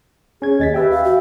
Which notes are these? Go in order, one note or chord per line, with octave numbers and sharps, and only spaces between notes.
C#4 G#4 G#6
D#2 D#5 A6 B6
G4 B4 E5 G5
F5
F#4